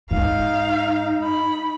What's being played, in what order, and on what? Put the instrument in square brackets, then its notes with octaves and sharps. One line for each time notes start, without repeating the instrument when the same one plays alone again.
[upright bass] G#2 [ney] D#4 [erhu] F5
[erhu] B5